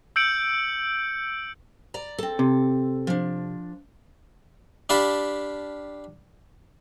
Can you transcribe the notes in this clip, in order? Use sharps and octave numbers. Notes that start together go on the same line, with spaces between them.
E6 G6 C#7 D7 F#7
D5 A#5
C4 A4
C3
F3 D4
D4 G4 F5 A5 B5